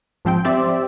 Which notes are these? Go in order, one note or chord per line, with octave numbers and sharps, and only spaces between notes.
G#2 F3 C4 G5
C4 G4 D5 E5